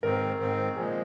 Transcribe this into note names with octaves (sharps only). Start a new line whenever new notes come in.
G#2 D#3 C4 A#4
G#2 D#3 C4
A#2 F3 G#3 G#4